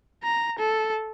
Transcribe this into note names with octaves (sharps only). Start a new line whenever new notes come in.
A#5
A4